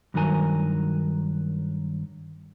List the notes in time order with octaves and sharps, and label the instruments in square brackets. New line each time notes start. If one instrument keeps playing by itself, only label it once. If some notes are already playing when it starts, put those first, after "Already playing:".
[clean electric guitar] G2 D#3 F#3 A#4 G#5